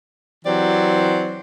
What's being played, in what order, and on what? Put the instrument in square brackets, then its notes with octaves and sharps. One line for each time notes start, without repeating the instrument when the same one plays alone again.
[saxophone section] E3 F#3 C4 G4 C5 D5